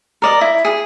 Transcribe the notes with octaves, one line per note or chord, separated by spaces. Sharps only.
A#4 D5 D#5
E4
G#4